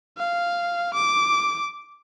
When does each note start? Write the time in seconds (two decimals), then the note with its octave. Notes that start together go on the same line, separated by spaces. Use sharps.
0.18 F5
0.95 D6